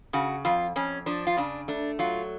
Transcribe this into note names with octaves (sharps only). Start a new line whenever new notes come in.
C#3 F#4
F2 F4
F2 C#4
F3 D4
F4
C#3 D4
A3 D4
F#3 F4